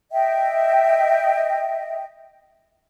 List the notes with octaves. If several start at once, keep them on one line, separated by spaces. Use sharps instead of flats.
D#5 E5 G5